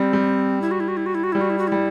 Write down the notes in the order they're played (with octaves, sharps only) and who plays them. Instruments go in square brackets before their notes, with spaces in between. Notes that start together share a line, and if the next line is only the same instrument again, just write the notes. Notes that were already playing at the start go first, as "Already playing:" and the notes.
Already playing: [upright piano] G3 [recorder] C4
[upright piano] G3
[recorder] E4
F#4
E4
F#4
E4
F#4
E4
F#4
[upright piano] G3 [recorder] E4
[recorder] F#4
E4
F#4
[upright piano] G3 [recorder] E4